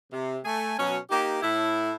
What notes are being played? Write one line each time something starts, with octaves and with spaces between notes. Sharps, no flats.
C3
A3 G#5
B2 F#3 C#4
A#3 D#4 G4
A2 E4